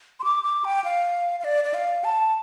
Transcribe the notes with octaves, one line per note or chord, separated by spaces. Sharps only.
C6
D6
D6
G5
F5
F5
D5
D5
F5
A5